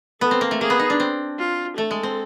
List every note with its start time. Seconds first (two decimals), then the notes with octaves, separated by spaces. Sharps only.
0.21 B3 A4
0.31 C4
0.41 A#3
0.51 A3
0.60 A#3 G#4
0.70 B3
0.79 D#4
0.90 D4
1.00 C4
1.39 F4
1.77 A3 A4
1.91 G#3
2.03 C4